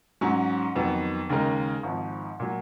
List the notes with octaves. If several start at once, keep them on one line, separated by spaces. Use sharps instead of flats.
G#2 F#3 C#4
F2 D#3 F#3 B3
D#2 C#3 G#3 D#4 A#4
G#1 G#2 F3
A#2 F#3